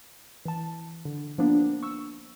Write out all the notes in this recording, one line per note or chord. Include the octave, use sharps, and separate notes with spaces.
E3 A5
D3
F3 A#3 B3 D4
C#6 E6